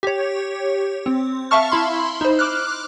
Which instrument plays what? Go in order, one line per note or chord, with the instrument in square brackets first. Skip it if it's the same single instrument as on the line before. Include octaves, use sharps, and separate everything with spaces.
[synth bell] G4 C#5
C4
E5 F5 A5 C#6 F6
E4 B5 C6
D#4 C5
D6 F6 F#6